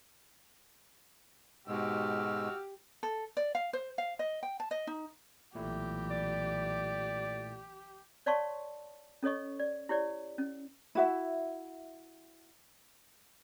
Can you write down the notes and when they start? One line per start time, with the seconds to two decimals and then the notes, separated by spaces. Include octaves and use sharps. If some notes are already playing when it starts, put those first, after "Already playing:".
1.68 G#2 B2 G#3 F#4 G4 E6 F6
3.03 A4
3.37 D5
3.55 F5
3.73 C5
3.98 F5
4.19 D#5
4.43 G5
4.60 A5
4.71 D#5
4.87 D#4
5.55 B1 A#2 E3 A3 E4 G4
6.11 D5
8.26 C#5 D5 F5 A5 C6 C#6
9.23 C#4 A4 C#5 D#5 C#6
9.60 D5
9.89 E4 G4 C#5 D5
10.38 C#4
10.95 E4 F#4 E5